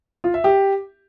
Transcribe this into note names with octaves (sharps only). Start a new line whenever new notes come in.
F4
E5
G4